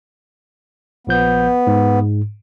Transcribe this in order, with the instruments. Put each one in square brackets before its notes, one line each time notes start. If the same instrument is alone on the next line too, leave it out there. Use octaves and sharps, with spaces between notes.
[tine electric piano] A#1 F3 G6 [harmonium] B3
[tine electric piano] G#2